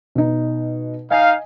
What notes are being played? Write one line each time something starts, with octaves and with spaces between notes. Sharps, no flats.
B2 D#4
D#4 D#5 F5 G#5